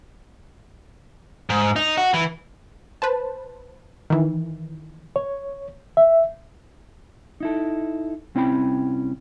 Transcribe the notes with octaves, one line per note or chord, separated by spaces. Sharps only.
G#2
D#4
F#4
E3
B4 C5 A5
D#3 E3
C#5
E5
D#4 E4 A4
C2 C4 C#4 E4 G5 B5